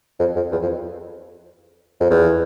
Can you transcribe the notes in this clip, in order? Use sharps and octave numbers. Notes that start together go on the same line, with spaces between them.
F2
F2
E2
F2
F2
E2